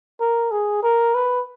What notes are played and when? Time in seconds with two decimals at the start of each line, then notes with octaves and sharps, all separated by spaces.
0.21 A#4
0.51 G#4
0.83 A#4
1.15 B4